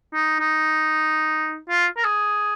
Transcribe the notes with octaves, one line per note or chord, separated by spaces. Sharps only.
D#4
D#4
F4
A#4
G#4